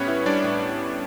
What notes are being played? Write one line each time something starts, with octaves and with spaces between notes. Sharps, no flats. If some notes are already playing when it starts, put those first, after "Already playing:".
Already playing: A2 G3 B3 C#4 B4 C#5
E4
G3 D4 D5
A2